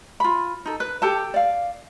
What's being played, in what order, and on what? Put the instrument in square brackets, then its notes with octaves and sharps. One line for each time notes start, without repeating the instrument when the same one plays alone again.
[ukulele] F4 B5
D#4 A4
B4
G4 A4 A5
D5 F5